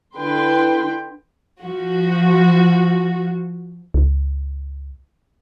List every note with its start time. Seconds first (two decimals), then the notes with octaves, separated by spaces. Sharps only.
0.17 D3 E4 B4 G5 C6
1.62 F3 F#4
3.94 C#2